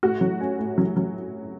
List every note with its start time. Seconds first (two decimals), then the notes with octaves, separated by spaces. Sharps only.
0.03 A2 F#4
0.21 F#3
0.40 C#4
0.59 A2
0.78 F#3
0.96 F#3